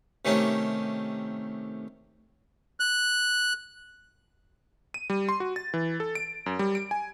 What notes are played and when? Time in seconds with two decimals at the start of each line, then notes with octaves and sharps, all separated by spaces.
0.25 C3 D#3 A3 C#4 G4
2.80 F#6
4.94 D#7
5.10 G3
5.29 C6
5.40 F#4
5.56 A6
5.74 E3
6.00 A4
6.15 D7
6.46 F#2
6.59 G3
6.75 D7
6.91 G#5